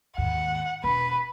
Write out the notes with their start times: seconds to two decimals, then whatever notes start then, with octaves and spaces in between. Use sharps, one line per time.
0.18 D#2 G#2 F#5
0.84 E1 B4